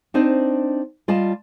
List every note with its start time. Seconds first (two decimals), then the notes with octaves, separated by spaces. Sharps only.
0.14 C4 D4 D#4 C5 D5
1.08 G3 F4 D5 D#5 F5 A5